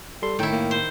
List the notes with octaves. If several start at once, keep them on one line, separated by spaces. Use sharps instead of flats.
G3 A4 C6
A2 D#3 E4 G5
A#3
C5